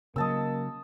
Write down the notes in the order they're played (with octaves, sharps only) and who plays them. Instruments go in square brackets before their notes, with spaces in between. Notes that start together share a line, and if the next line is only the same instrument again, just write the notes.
[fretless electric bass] C#3 F#3 [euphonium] A#3 [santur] D#5 A5 E6